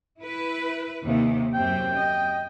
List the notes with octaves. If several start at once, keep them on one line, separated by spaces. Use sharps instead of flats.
E4 B4
D#2 C3 D#4
F#2 C3 C4 G5
D#5